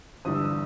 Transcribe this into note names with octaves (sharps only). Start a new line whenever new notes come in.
G1 G2 E3 G3 D#6
E6
D#6